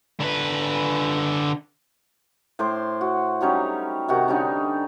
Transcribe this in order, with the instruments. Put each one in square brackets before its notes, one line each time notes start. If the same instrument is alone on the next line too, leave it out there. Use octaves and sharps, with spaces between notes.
[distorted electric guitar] D3 B4
[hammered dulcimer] A2 C5 C6 D6
F#4
F#3 G3 C#4 D#4
C3 D#3 F#4 G4
D3 G3 C#4 D#4